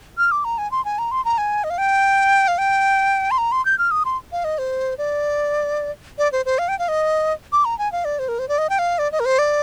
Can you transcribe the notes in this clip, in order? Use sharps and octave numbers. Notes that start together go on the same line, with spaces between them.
F6
D6
A#5
G#5
C6
G#5
A#5
C6
A#5
G#5
D#5
F5
G5
F5
G5
C6
A#5
C6
G6
F6
D#6
C6
F5
D#5
C5
D5
D5
C5
C5
F5
G5
F5
D#5
D6
A#5
G#5
F5
D5
C5
A#4
C5
D5
D#5
G5
F5
D5
D#5
A#4
C5
D5